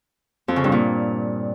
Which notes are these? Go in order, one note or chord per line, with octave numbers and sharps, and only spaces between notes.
F2
C#3
G2
A#2